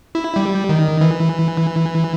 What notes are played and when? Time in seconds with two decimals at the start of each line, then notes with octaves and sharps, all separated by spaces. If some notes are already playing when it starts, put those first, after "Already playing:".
0.15 E4
0.36 G3
0.69 D#3
1.01 E3